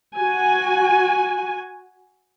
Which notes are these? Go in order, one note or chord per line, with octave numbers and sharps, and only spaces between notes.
F#4 G#5